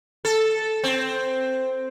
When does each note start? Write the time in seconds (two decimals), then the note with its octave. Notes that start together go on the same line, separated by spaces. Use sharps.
0.25 A4
0.84 C4